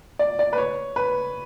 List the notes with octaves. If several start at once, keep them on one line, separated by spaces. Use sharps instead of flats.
D5
D5
B4
C#5
B4